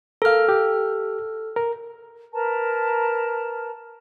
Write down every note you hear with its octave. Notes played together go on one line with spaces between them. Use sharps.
A4 A#4 F5 F6
G4
A#4
A#4 B4 A5 A#5